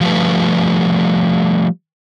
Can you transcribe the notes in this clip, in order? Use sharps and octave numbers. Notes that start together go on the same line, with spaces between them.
F3 G3 A3 B4